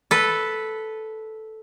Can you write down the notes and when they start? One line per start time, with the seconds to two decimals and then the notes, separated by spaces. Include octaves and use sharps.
0.11 A4 B4